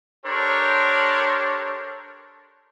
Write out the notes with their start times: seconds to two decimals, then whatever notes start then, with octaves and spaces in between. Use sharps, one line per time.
0.25 D4 G4 A4 A#4 C5 C#5